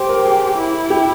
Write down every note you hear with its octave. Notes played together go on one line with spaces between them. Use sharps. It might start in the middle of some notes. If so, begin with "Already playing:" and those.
Already playing: G4 C5
A#4
G#4
E4
G4